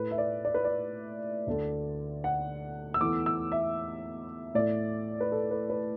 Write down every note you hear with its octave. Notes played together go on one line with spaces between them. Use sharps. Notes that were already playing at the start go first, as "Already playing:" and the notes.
Already playing: A2 A3 B4
E5
D5
D5
B4
D5
D2 D3 A3
F#5
E6
E2 E3 A3 D6
E6
E5
A2 A3 D5
B4
A4
B4
B4